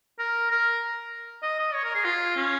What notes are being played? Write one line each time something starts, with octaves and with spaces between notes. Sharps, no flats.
A#4
A#4
D#5
D#5
C#5
A#4
G#4
F4
C#4